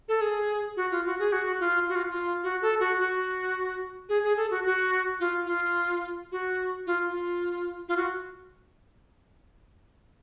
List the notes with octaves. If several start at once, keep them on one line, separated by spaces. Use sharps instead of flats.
A4
G#4
F#4
F4
F#4
G#4
F#4
F4
F#4
F4
F4
F#4
A4
F#4
F#4
G#4
G#4
A4
F#4
F#4
F4
F4
F#4
F4
F4
F4
F#4